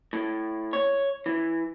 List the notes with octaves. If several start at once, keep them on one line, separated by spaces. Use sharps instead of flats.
A2
C#5
E3